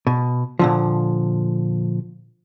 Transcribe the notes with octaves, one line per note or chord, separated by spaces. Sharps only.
B2
A#2 D3 F3